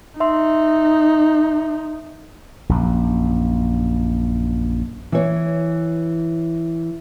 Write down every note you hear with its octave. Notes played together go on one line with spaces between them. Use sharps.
D#4 E5 C6
A#1 F#2
E3 C#5